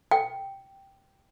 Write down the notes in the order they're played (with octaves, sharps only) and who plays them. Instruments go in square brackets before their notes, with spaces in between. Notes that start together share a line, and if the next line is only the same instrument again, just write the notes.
[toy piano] G5